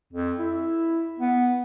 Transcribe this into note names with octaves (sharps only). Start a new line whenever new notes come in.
F2
E4
B3